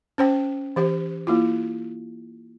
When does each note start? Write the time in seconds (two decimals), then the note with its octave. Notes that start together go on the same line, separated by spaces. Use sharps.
0.18 C#4 C5 G5
0.76 E3 G4 C5
1.27 A#3 E4 F4